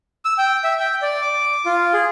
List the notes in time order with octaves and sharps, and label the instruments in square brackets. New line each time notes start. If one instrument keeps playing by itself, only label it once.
[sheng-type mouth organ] E6
G5
E5
G5
D5
D6
F4
G#4